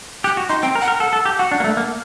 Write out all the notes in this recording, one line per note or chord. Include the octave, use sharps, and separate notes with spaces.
G4 F#6
F#4
D#4 C6
C4 G5
A#4
F#5
A#4
A4 F#5
A4
G4
F#4 F#5
D4
A#3
A3
A#3